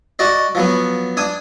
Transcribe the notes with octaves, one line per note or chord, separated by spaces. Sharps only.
F#4 D5 D#5
F3 F#3 B3
D4 G#5 D#6